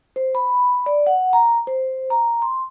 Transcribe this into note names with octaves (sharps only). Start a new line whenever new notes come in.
C5
B5
D5
F#5
A#5
C5
A#5
C6